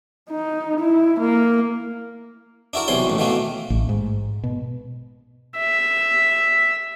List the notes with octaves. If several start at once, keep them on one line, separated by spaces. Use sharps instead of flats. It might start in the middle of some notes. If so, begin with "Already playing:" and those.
D#4
E4
A#3
D4 E4 F#4 A#4
B1 C3 E3 G3 C#5 C6
A1 D#2
B2 D#3 E3 A3 A#3
A1
G#2
B2
E5